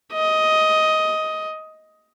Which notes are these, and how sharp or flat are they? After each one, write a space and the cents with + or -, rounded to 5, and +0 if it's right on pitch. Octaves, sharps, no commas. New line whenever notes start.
D#5 +10